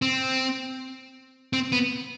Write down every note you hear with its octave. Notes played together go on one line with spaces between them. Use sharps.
C4
C4
B3